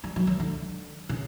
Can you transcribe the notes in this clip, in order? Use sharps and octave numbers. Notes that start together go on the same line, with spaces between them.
G3
F#3
E3
D3
C#3